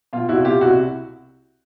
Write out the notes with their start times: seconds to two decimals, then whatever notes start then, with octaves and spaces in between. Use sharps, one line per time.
0.13 B2 F4
0.29 C2 E4 F#4
0.45 B2 F4 G4
0.61 C2 E4 F#4